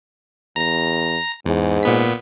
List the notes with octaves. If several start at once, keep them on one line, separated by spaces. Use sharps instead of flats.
E2 A#5 A#6
E2 G#2
A#2 B3 B6